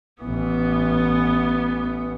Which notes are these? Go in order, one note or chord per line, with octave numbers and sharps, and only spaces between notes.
A1 E3 B3